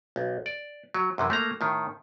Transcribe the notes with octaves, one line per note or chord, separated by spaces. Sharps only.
B1
D5
F#3
F#2 C3 E3
A3 A#3 A#5
A2 D#3